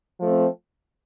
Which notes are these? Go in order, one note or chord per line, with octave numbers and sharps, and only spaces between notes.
F3 A3 C4